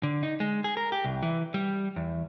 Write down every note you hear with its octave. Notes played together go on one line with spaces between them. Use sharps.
D3
D#4
G#3
G#4
A#4
G4
C2
E3
G3
E2